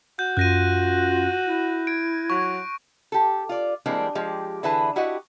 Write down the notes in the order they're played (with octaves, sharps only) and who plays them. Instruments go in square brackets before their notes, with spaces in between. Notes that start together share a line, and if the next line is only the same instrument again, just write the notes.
[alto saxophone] F#4 [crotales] G6
[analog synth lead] F#2 [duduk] F4 [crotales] F#6 A#6 D#7
[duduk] E4
[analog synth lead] G#6 [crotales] D7
[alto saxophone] F#3 [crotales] C#6
[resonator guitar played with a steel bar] G4 A4
F4 D5
E3 G3 G#3 A#3 C4 D4
F3 G#3 G4
D3 E3 E4 G#4 B4 A5
E4 F#4 G4 D#5 F#5